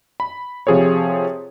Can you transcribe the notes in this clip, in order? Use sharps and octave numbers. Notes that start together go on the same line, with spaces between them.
B5
C3 F3 G#4 A4 C#5